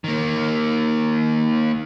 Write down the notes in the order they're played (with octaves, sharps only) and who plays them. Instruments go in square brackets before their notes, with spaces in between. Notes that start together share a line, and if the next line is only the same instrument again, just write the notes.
[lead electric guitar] D#3 A#3